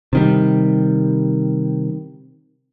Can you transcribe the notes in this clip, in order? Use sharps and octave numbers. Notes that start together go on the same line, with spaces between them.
C3 D#3 G3